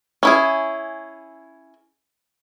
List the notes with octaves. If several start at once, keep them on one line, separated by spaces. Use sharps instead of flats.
C#4 E4 G#4